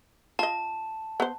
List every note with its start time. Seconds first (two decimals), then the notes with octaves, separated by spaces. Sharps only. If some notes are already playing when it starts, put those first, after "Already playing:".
0.39 F4 D#5 A5
1.20 B3 C5